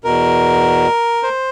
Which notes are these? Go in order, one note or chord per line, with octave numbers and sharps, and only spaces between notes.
E2 B2 A#4
C5